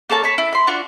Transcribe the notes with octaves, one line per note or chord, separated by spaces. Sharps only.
A#3 A4 C#5 A5
C#5 A5 B5
E4
B5 C6
D4 F4 F#4 D5